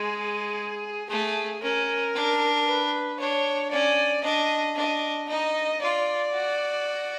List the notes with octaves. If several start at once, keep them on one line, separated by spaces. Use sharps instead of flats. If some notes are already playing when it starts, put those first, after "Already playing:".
Already playing: G#3 G#4
A3 G#4
C#4 A#4
D4
B4
D4 C#5
C#4 D5
D4 D#5
D4 D#5
D#4 D#5
F4 D5
F#4